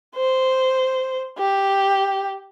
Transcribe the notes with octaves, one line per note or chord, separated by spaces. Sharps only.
C5
G4